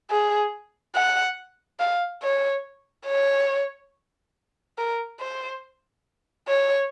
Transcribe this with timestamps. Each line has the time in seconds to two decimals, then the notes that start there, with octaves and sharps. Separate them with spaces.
0.10 G#4
0.95 F#5
1.79 F5
2.23 C#5
3.07 C#5
4.78 A#4
5.20 C5
6.48 C#5